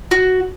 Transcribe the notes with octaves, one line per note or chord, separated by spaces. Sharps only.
F#4